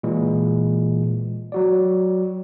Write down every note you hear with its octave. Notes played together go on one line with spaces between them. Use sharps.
A#2 E3 G#3
F#3 F#4 D5